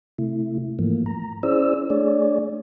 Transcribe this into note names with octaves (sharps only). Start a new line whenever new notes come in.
C3 A3 E4
G#2 E3 F3 A3 A#3
A#5
C#4 E4 G#4 C5 D5 E6
A3 D4 G#4 C#5 D5